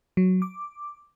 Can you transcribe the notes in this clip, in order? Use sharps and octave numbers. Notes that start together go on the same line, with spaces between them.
F#3
D6